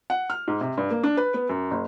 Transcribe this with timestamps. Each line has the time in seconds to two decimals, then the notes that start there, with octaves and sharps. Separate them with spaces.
0.10 F#5
0.30 F6
0.48 G#2
0.61 C3
0.77 G2
0.90 A#3
1.04 D4
1.17 B4
1.34 B3
1.49 F#2
1.71 F#1